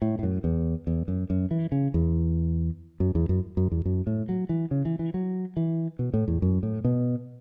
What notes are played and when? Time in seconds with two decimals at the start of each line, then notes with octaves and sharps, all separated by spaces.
0.02 A2
0.19 A2
0.23 F#2
0.44 E2
0.87 E2
1.08 F#2
1.30 F#2
1.51 E3
1.72 C#3
1.94 E2
3.00 F#2
3.15 E2
3.29 F#2
3.57 F#2
3.71 E2
3.85 F#2
4.07 A2
4.29 F#3
4.49 E3
4.71 C#3
4.85 E3
4.99 E3
5.14 F#3
5.57 E3
5.99 B2
6.14 A2
6.28 E2
6.42 F#2
6.63 A2
6.84 B2